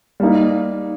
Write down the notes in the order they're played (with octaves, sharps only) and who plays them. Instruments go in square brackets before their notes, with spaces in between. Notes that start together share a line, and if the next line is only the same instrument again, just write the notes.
[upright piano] G3 A#3 D#4